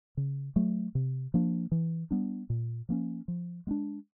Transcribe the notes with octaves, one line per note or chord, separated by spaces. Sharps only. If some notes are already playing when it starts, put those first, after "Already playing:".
C#3
F#3 A3
C3
F3 A#3 D4
E3
G3 B3 D4
A#2
F3 A#3 C#4
F3
G#3 B3 D4